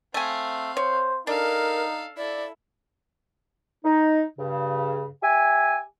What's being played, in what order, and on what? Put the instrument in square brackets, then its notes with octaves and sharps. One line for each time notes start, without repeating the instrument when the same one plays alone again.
[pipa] A3 G#5 [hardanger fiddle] C4 F5
[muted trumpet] C5 [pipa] C#5
[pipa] D4 [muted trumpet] D#4 [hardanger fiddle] A4 F5 [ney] A#4
[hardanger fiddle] E4 A4 [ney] D5
[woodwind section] D#4
G2 C#3
G4 E5 G#5